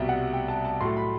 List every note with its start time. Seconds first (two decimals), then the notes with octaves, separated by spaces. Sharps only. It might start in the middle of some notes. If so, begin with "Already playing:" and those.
Already playing: C2 B2 G3 E5
0.09 F#5
0.33 G5
0.48 A5
0.65 A5
0.81 A2 F#3 A3 C6
0.97 B5